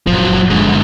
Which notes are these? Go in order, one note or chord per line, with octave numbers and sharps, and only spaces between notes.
F#1 A#2 F3 F#3
G#2 D3